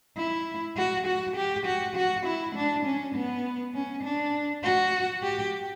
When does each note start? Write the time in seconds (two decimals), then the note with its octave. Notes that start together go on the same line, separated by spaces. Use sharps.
0.18 E4
0.77 F#4
1.07 F#4
1.36 G4
1.66 F#4
1.96 F#4
2.26 E4
2.55 D4
2.85 C#4
3.15 B3
3.75 C#4
4.04 D4
4.64 F#4
5.23 G4